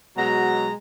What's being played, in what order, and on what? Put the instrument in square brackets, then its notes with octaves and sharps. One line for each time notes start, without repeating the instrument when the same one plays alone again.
[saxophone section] B2 F#3 F#4 [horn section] G#3 A#5